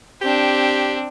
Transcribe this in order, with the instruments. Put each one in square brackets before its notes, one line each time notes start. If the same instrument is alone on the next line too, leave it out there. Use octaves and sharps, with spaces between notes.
[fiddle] C4 D4 [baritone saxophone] G4